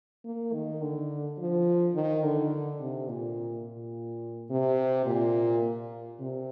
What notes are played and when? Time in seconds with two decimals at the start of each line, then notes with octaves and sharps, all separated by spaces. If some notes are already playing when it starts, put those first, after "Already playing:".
0.25 A#3
0.53 D#3
0.82 D3
1.38 F3
1.95 D#3
2.23 D3
2.80 C3
3.08 A#2
3.65 A#2
4.50 C3
5.06 A#2
6.20 C3